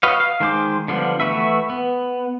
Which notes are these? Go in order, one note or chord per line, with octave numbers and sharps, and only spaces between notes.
F#4 B4 C#5 D#5 F5
F5
D#3 G#3 C5 D6
D3 F3 G3 B3
E3 A3 F#4 B4 E5
B3